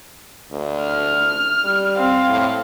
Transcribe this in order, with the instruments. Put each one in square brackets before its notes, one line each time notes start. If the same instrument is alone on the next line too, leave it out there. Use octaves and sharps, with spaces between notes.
[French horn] D2
[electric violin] F6
[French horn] G3
[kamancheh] C4 [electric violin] F5
[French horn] A2